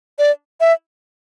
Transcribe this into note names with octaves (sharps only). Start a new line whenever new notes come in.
D5
E5